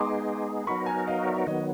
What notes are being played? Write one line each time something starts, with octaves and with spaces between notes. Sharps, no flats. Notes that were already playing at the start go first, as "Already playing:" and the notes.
Already playing: G#3 B3 D#4 G#4 C6 D6
F#3 B3 D#4 F#4 A#4 B5 C#6
G#5 A#5
D#5 F5
D5 E5
D#3 F#3 B3 C#5 D#5